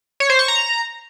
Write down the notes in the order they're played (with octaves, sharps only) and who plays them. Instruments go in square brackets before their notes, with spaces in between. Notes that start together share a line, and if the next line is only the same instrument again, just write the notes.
[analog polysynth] C#5
C5
C#6
A#5